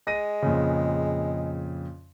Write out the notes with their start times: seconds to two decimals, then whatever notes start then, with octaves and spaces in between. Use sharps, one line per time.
0.07 G#3 A#6 D#7
0.42 F2 A#2 C#3